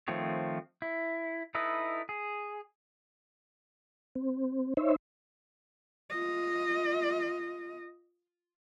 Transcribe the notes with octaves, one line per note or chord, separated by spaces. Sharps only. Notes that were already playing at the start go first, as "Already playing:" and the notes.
D#3 F3 A3 C4 C#5
E4
D#4 E4 A4 B4 D#5
G#4
C4
D#4 C5 C#5 E5
F4 D#5